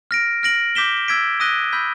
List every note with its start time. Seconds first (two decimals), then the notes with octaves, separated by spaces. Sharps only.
0.11 F6 A#6 D7
0.43 F6 A#6 D7 F#7
0.75 D6 G6 B6 E7 G7
1.08 E6 G#6 B6 D7
1.40 D#6 F#6 A#6 D#7 G7
1.72 B5 E6 G6 B6